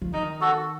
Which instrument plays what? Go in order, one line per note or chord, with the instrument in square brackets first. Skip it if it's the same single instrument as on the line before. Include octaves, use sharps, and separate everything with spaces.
[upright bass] F3
[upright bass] D#3 [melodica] D#4
[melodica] F#4 A4